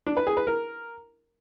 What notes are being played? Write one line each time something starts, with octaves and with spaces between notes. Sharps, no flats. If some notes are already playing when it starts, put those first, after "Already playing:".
D4
B4
G#4
B4
A#4